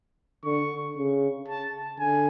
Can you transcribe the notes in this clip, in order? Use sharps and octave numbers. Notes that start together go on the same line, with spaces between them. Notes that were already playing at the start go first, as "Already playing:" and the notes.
D3 C#6
C#3
A5
D3 G#5